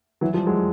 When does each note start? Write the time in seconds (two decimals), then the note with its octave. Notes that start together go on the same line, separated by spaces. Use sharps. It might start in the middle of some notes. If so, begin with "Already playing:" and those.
0.21 E3 F#3
0.33 F3 G3
0.47 F#3 G#3